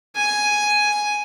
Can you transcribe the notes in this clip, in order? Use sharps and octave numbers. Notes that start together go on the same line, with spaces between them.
G#5